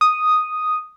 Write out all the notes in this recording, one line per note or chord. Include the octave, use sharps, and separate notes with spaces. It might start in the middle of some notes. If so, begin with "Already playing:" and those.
D#6